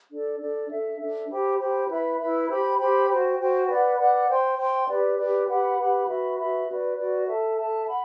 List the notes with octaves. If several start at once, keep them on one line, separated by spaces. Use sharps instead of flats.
D4 A4 D5
D4 A4 D5
D4 A4 E5
D4 A4 E5
G4 C5 G5 B5
G4 C5 G5 B5
E4 B4 E5 B5
E4 B4 E5 B5
G4 C5 G5 B5
G4 C5 G5 B5
F#4 C5 G5
F#4 C5 G5
B4 D5 F#5
B4 D5 F#5
C5 G5 C6
C5 G5 C6
G4 B4 D5
G4 B4 D5
G4 B4 F#5 B5
G4 B4 F#5 B5
F#4 B4 E5 B5
F#4 B4 E5 B5
F#4 B4 D5
F#4 B4 D5
A4 E5 A5
A4 E5 A5
F#5 B5